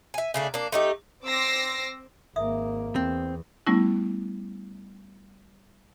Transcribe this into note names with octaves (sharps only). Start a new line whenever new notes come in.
E5 G#5
C#3 A3 D4
A#3 D4
A3 D#4 G4
C4 D6 E6 A#6 C7
G#1 A#3 E5 D#6
E2 C4
G3 A3 B3 C#4 E4